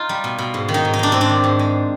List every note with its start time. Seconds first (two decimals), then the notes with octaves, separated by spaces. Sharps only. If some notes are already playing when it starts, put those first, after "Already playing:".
Already playing: D#4 F4
0.09 G3
0.24 B2
0.38 B2
0.54 G#2
0.69 D#3
0.74 D#4
0.85 G#2
0.94 D#4
0.99 G#3 D4
1.12 G#2 C4
1.21 D4
1.29 D#3
1.44 G#2
1.59 G#3